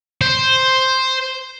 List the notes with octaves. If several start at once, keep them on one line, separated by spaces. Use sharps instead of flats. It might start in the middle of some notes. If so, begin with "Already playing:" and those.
C5